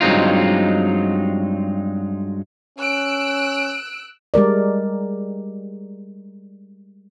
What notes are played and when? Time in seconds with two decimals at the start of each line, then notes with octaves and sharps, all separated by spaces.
0.01 G2 F#3 G#3 C4 D#4 F4
2.78 C#4 E6 F#6 D7
4.34 G3 G#3 A#4 D5